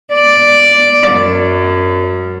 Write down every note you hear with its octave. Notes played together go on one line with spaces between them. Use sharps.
D5
F#2